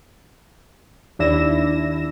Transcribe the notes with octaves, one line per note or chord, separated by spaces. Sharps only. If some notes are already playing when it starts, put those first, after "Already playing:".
D#2 D4 E4 E5 A#6 E7